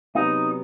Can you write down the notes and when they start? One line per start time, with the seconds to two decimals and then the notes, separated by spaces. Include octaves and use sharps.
0.15 C3 F#3 B3 D#4